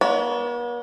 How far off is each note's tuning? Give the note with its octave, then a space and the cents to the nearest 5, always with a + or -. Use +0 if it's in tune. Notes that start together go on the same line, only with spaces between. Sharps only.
B3 -45 C#5 +40